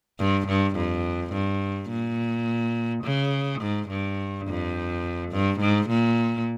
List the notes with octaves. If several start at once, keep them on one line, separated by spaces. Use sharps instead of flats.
G2
G2
F2
G2
A#2
C#3
G#2
G2
F2
G2
G#2
A#2